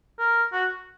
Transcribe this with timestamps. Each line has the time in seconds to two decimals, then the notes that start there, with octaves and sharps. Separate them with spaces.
0.19 A#4
0.52 F#4